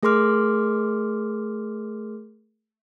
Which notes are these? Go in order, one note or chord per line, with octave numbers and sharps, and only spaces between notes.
A3 G#4 A#4 C6 D6 F6